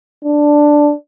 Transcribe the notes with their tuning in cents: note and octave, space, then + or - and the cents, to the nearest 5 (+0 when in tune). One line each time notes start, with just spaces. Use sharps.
D4 +5